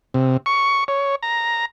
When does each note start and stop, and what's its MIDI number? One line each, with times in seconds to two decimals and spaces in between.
0.14 0.37 48
0.46 0.84 85
0.88 1.15 73
1.23 1.65 82